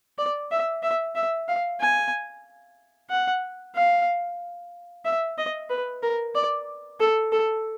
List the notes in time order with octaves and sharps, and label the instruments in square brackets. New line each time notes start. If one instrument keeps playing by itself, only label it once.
[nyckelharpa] D5
E5
E5
E5
F5
G#5
F#5
F5
E5
D#5
B4
A#4
D5
A4
A4